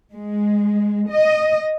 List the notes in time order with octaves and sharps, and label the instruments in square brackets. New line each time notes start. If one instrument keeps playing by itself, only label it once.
[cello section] G#3
D#5